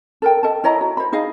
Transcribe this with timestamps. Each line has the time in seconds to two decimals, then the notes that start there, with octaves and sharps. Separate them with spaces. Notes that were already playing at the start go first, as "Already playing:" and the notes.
0.22 A4 A#4 G5
0.43 A4 D#5 A5
0.64 E4 C#5 D#5 A#5
0.81 F#4
0.97 C5 B5
1.12 D#4 G#4 D#5 F5